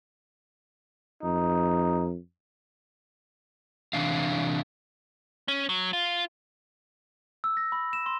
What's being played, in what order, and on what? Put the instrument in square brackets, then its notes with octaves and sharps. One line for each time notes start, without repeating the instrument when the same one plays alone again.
[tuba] F2 [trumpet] D#4
[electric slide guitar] C3 E3 D4 F5
[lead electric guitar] C#4
F#3
F4
[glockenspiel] E6
A#6
B5
E7
C6